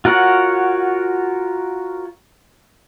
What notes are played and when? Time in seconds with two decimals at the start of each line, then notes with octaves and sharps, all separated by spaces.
0.05 F4 F#4 A#4 C#5 F#5